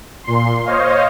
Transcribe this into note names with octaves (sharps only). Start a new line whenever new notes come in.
A#2 C6
C5 C#5 D#5 F5